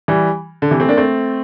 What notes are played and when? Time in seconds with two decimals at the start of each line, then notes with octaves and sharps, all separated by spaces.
0.08 E3 G3
0.62 D3
0.71 C3 E3
0.80 A3 C4
0.89 A#3 D4
0.97 A3 C4